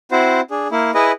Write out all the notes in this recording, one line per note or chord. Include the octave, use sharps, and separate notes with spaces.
C4 E4 F#4 C5
D4 G#4
A#3 E4
E4 G#4 B4 D#5